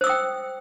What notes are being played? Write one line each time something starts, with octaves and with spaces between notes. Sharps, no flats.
C5 G5 D#6 E6